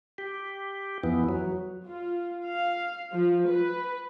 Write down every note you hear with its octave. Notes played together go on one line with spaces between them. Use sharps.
G4
F2 E3 B3
F#3
F4
F5
F3
B4